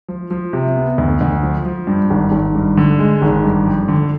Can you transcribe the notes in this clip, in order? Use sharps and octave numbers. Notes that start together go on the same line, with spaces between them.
F3
F3
C3
B3
D2
D2
F3
F3
G2
G#1
G#1
G2
D3
G#3
G#1
G2
F2
D3